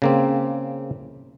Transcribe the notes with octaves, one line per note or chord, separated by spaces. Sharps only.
C#3 A#3 C4